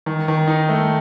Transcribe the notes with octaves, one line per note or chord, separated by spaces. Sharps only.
D#3
D#3
D#4
A3